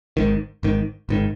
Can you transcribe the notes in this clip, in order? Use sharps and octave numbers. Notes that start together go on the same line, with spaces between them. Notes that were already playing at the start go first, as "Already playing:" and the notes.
G#1 G#2 D#3
G#1 G#2 D#3
G#1 G#2 D#3